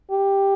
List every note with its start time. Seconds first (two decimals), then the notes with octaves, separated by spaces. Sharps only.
0.11 G4